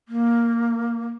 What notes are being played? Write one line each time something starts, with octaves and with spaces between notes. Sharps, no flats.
A#3